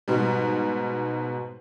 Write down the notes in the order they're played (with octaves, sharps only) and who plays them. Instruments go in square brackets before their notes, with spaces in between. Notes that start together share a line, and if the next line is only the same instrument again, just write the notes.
[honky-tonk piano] G#2 B2 G3